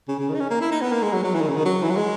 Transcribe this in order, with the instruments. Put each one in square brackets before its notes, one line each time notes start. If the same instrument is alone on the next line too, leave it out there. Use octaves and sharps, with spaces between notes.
[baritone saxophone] C#3
C#3
D#3
D#4
C#4
A#3
E4
D#4
B3
A#3
G#3
F#3
F#3
E3
D#3
C#3
D#3
F#3
E3
F#3
G#3